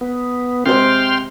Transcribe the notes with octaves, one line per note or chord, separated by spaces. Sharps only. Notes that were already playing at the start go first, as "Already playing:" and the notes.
B3
C3 G#3 C5 G5 C6 F6